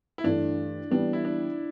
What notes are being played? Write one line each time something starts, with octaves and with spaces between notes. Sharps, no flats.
E4
G2 E3 A3 D4
E3 G3 B3 D4
E4
D4